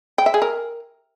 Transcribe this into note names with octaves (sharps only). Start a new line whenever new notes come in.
G5
E5
G#4
A#4